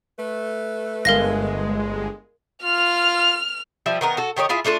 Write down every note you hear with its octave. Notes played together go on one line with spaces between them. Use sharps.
A3 B4
G1 G#3 A#4 F5 A#6
F4 F6 F7
F3 G3 E5
D#3 B3 A#4
F#4 A4
D#3 G4 C#5 D#5
E4 F4 G#4 E5
A3 D4 F4 A4